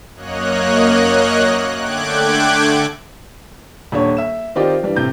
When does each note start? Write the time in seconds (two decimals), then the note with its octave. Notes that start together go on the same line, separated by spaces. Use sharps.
0.14 F#2 A#3 C#5 D#5 F#6
1.76 D3 A3 G5 D6 F#6 G#6
3.92 D#1 D4 C#5
4.17 E5 E7
4.55 D#3 C4 D#4 F4 G4 D5
4.83 G2 E3 G3
4.96 A2 C3 G6